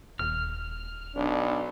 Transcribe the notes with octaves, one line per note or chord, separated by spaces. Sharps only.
D#1 F6
B1 D4